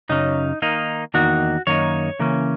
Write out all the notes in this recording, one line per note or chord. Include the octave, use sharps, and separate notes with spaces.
F#2 C#3 F#3 C#4 D#4
D#3 A#3 D#4
E2 D#3 A#3 D#4 F#4
F#2 D#3 A#3 D#4 C#5
C#3 E3 A#3 C#4